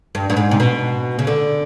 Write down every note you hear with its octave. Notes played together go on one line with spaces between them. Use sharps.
G2
G2
G#2
C3
B2
C#3
D3